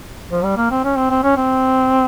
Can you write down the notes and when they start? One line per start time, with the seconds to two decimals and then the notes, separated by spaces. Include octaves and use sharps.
0.31 F3
0.43 G3
0.57 A#3
0.71 C4
0.84 C#4
0.96 C4
1.10 C4
1.23 C#4
1.36 C4